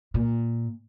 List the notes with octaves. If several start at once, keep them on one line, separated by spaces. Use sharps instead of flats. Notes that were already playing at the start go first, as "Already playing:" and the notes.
A#2